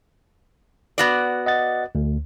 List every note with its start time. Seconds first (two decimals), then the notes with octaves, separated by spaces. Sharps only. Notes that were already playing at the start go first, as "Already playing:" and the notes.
0.98 B3 F#4 D5
1.46 D#5 F#5 A6
1.95 D2